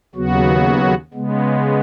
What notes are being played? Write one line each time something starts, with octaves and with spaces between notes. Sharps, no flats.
D#2 C#3 F#3 B3 F#4
C#3 G#3 B3